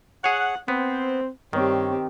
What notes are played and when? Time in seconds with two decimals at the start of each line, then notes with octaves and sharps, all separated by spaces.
0.24 G#4 C#5 F#5
0.68 B3 C4 C5
1.53 G2 D#3 C4 G4 C#5